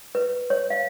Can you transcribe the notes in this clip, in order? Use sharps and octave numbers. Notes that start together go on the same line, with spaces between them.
B4
C#5
F5